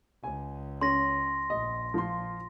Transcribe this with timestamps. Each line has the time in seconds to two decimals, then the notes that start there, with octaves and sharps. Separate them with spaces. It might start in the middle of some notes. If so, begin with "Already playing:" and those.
0.24 C#2 G#5
0.81 C#4 C6 A#6
1.50 A#1 D#5
1.94 F3 F4 C6